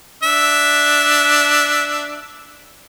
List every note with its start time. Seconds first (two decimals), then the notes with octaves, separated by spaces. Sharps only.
0.23 D4 E5